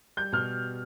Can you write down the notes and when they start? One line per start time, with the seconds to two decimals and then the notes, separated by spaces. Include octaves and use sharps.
0.17 G3 G6
0.33 B2 F6